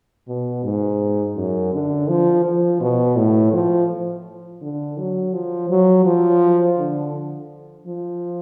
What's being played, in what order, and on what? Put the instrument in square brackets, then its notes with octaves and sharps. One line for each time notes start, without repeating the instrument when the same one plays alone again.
[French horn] B2
G#2
F#2
D3
F3
F3
B2
A2
F3
D3
F#3
F3
F#3
F3
D3
F3